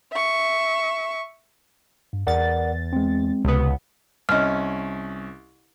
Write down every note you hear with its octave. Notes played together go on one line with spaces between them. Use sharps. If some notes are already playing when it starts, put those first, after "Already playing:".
E5 C#6
G2
E2 A#4 D5 F#5 A6
G#3 C4
C#2 C3 B3 D#6
C2 C#4 D#5 F6